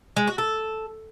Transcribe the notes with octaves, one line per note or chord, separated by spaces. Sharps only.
G#3
F#4
A4